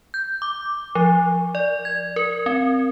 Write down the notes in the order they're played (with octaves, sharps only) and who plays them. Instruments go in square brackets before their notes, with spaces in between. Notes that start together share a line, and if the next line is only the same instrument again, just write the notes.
[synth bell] G6
D6
F3
D5
G#6
A#4
C4